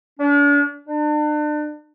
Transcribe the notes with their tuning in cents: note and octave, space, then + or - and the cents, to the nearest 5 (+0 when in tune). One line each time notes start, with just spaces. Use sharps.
D4 -40
D4 +35